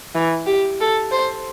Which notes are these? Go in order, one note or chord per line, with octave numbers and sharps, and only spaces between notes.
E3
G4
A4
C5